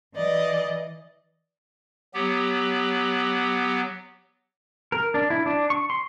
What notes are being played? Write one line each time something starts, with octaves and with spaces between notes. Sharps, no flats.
E3 D5 D#5
F#3 B3 G4
A#4
D4
E4
D4
C#6
C6